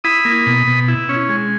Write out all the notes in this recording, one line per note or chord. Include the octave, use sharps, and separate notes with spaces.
E4 B5 D#6
A#3
B2
B2
E4
C#4
G#3